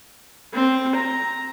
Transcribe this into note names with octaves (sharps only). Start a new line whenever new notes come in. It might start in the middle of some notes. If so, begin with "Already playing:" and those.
C4
A#5